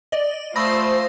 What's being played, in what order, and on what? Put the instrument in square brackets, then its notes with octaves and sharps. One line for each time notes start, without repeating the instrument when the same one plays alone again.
[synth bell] D5 D#5
[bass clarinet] A3 [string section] F4 C5 [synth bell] B5 D#6 E6 [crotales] A#6